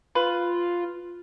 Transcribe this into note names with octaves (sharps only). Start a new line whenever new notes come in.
F4 B4